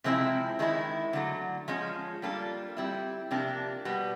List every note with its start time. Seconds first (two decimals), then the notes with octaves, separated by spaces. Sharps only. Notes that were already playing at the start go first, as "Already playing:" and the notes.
0.04 C3 F3 G#3 C4 E4
0.59 D#3 G#3 C#4 E4
1.13 D3 F#3 A3
1.68 F3 G#3 C#4
2.22 G3 A#3 D4 F4 A4
2.77 G3 C4 E4
3.31 C3 F3 A#3 D4 G4
3.85 B2 G3 B3